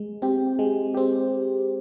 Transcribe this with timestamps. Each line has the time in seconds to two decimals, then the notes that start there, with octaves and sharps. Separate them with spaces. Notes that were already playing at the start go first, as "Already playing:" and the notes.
Already playing: G#3
0.22 C4 G4
0.59 G#3
0.94 C4 G4